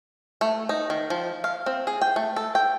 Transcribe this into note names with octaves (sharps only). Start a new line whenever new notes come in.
A3
D#4
D#3
F3
F5
C4
G#4
G5
A3
A4
G5